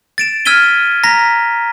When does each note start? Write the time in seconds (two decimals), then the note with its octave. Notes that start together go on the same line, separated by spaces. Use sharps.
0.18 A6 D7 E7
0.45 E6 F6 G#6 B6 D#7 G7
1.03 A#5 A#6 B6